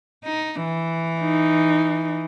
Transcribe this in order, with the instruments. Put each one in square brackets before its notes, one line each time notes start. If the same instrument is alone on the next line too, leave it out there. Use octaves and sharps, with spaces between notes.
[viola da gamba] D#4
E3
[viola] D#4